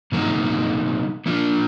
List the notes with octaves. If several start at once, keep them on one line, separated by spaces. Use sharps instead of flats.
B2 F#3 A#3 D#4
F3 A#3 D4 F4